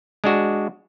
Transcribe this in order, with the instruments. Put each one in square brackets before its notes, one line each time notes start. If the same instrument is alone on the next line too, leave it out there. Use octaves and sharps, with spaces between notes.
[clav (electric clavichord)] G#3 D4 F#4